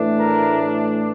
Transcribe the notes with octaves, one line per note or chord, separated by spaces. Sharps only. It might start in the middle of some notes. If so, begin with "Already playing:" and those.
Already playing: A2 E3 A3 D4
A#4